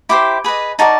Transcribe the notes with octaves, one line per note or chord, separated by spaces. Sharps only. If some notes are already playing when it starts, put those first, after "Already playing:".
E4 G4 C5 D6
G#4 B4 D#5
D#4 F#4 A#4 D5 A5